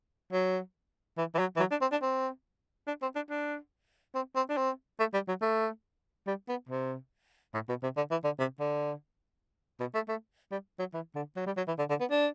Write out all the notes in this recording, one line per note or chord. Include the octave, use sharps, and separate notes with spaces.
F#3
E3
E3
F#3
E3
F#3
D4
C4
D4
C4
D4
C4
D4
D4
C4
C4
D4
C4
A3
G3
F#3
A3
G3
B3
C3
A2
B2
C3
D3
E3
D3
C3
D3
B2
A3
A3
G3
F#3
E3
D3
F#3
G3
F#3
E3
D3
D3
B3
D4